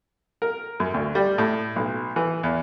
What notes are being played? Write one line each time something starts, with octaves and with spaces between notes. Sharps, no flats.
A#4
F#2
D2
G3
A2
B1
E3
E2